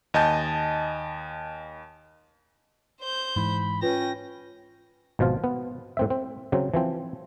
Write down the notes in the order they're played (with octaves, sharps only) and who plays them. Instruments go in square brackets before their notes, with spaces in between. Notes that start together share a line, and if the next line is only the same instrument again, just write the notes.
[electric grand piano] D#2 D#5 G#5 A5 G6
[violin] C5 G6
[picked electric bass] G#2 E3 [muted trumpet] B5
[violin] C#4 A#6 [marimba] F4 B4 [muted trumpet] G5
[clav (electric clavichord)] G#1 B2 F3 F4
B3
A2 C4 E5
C4
C#3 F#3 C4
E3 F3 C4